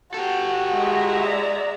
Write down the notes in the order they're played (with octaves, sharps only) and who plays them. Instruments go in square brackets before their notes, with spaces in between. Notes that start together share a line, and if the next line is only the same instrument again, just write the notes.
[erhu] F#4 [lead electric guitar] G4 A4
[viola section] G#3 E5 A#5
[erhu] D5